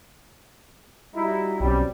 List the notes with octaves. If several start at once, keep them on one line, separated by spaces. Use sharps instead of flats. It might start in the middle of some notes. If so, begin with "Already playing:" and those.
G3 D#4 E4 F#4 G4
B1 F#3 G3 C4 C#4